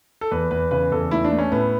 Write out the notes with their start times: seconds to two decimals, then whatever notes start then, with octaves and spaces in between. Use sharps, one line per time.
0.21 A4
0.31 E2 B4
0.51 E2 B4
0.71 C#3 B4
0.91 E2 A4
1.11 A3 E4
1.24 D4
1.31 A3
1.39 C#4
1.52 A2 B3